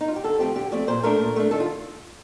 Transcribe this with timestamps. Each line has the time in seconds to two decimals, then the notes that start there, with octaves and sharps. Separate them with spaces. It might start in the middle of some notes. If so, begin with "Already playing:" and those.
0.01 D#4
0.08 F4
0.16 G4
0.24 D3 A4
0.39 F3 A3 C4 G4
0.56 D3 G4
0.72 F3 A3 C4 D5
0.87 A#2 C5
1.03 A3 D4 A#4
1.19 A#2
1.36 A3 D4
1.51 D#3 A4
1.60 F4